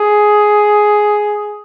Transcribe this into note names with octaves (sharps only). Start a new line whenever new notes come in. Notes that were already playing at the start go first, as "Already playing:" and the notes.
Already playing: G#4